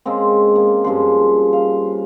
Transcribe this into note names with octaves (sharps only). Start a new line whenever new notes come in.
C#3 G#3 A#3 C4
A#3
G2 C#3 F3 C6
F5